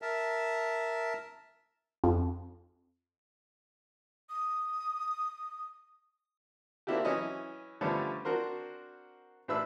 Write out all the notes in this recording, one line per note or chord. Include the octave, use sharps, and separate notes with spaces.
A#4 E5 A5
F2
D#6
A#3 C4 D4 E4 F#4 G4
E3 F#3 C#4 D#5
D3 F3 G3 A3 B3 C#4
C4 D4 F#4 A#4 C5
A1 D4 B4 E5 E6